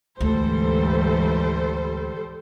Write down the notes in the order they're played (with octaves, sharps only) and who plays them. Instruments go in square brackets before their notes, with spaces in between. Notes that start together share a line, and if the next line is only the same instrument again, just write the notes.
[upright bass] D2 [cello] G#2 E3 [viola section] G3 A4 C5